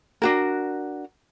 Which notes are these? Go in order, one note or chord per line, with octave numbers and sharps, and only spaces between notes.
D4 F#4 A#4